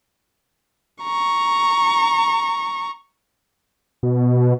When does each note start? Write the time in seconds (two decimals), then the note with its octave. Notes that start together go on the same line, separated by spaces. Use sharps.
1.03 A#5 C#6
4.03 B2